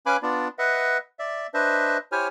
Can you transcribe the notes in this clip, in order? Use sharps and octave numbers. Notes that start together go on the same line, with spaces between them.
C#4 B4 F5 G#5 B5 D6
B3 D4 F4 D5
B4 D#5 E5 F#5
D5 E5
D4 B4 C5 D#5 E5
E4 G4 C5 C#5 G#5 F6